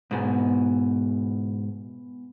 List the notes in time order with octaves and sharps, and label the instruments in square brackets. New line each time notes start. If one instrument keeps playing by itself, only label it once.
[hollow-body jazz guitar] G#2 B2 [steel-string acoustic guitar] B3 E4 G#5